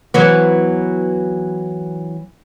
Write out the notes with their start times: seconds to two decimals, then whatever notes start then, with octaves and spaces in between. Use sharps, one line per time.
0.14 E3 F#3 B3